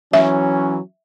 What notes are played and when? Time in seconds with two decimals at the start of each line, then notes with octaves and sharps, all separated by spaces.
0.13 E3 F#3 C#4 E5